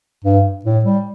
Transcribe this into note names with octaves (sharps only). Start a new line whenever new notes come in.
G2
A2
G3